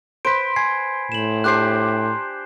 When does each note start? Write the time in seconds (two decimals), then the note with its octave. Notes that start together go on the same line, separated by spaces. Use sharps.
0.25 B4 C5 B6 D7
0.56 G#5 G#6 C7
1.12 A2 E7 F#7
1.44 D4 G4 C5 F#6 G6 C7